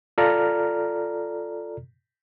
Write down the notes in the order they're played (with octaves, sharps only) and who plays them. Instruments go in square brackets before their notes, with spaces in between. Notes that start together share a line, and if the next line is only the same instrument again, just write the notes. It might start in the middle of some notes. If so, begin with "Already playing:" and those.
[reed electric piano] F4 A4 D5 A#5 F6